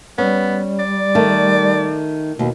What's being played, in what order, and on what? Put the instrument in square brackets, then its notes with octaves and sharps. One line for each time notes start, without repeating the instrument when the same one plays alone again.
[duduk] G3 [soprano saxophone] B3 [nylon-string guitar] C#4
[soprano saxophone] D5
[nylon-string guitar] D#3 A3
[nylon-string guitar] D#2 [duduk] B2